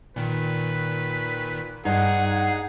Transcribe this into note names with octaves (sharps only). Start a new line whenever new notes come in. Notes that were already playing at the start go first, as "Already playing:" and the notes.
A#2 D#3 B4
G2 D#4 G#4 F#5